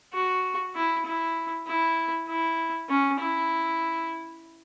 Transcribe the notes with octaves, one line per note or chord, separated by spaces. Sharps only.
F#4
E4
E4
E4
E4
C#4
E4